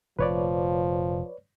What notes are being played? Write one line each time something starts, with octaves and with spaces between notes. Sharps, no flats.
F1 A#2 F3 B4 C#5 D5